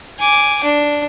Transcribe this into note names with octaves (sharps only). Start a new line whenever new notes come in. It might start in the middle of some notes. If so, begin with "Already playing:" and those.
G#5 D6
D4